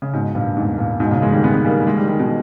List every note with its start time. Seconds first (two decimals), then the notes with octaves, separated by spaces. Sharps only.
0.02 C#3
0.13 G#2 B2
0.35 G2 A#2
0.57 E2 G#2
0.78 G2 A#2
1.00 G#2 B2
1.11 A#2 C#3
1.22 E3 G#3
1.33 D#3 G3
1.44 G#3 B3
1.55 B3
1.65 G3 A#3
1.87 E3 G#3
1.97 D#3 G3
2.08 D#3 G3
2.19 B2 D#3